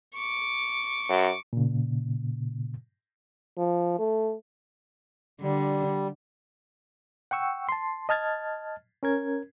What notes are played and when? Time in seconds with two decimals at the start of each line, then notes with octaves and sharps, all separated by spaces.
0.15 C#6 D6
1.09 F#2
1.53 A#2 C#3
3.58 F3
3.99 A3
5.41 D3 G3
7.31 F#5 G5 C#6 E6
7.69 A5 C6
8.09 D#5 A5 F6 G#6 A6
9.03 C#4 A#4 G#6